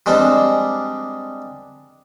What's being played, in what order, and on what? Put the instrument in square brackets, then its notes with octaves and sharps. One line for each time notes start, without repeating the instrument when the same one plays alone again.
[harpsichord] G3 G#3 C4 D4